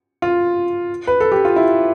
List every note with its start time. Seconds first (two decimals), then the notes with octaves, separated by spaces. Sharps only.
0.22 F4
1.07 B4
1.20 A4
1.32 G4
1.45 F4
1.56 E4